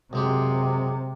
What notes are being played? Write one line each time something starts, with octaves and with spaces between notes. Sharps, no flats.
F#2 C3 G#3 G4